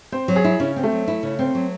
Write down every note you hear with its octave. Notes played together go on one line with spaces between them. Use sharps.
C4 C5
F#3
G#4
E4
C#3 C#4
C4
A3
F#3
E4
C#3
C4
F#3